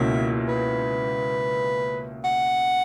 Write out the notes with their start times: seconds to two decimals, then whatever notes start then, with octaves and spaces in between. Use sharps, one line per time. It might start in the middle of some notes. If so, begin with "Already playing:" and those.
Already playing: C#2 B2 A#3 C#4 E4 E5
0.48 B4
2.24 F#5